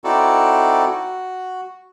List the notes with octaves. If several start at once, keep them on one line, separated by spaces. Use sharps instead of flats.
C4 D#4 E4 F#4 A4 D5
F#4